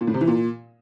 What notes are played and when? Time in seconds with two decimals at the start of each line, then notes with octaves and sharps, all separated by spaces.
0.01 A#2
0.07 A2
0.14 C3
0.21 E3
0.27 A#2